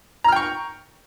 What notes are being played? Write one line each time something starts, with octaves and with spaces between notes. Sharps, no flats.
G5 A#5 C#6 F6